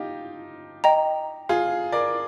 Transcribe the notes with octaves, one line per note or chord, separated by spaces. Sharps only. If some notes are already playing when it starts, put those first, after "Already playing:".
Already playing: D#4 F4 G4
D#5 G5 A#5
F4 G#4
A#4 D5